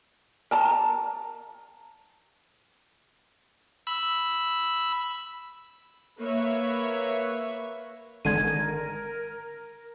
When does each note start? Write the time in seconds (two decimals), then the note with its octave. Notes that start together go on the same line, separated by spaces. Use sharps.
0.51 A#4 A5 A#5
3.87 B5 E6
6.19 A#3 B4 C#5 E5
8.25 G#1 D3 G#3 A#4 G#6 D#7